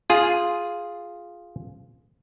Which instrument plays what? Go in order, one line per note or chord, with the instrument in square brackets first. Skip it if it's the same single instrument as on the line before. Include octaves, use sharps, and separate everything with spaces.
[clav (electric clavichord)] F4 G#4